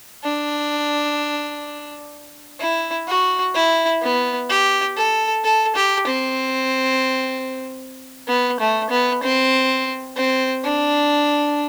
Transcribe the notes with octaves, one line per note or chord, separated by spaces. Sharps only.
D4
E4
F#4
E4
B3
G4
A4
A4
G4
C4
B3
A3
B3
C4
C4
D4